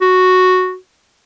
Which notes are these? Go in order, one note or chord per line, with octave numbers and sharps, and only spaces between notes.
F#4